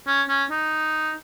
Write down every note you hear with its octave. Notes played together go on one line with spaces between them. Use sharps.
C#4
C#4
D#4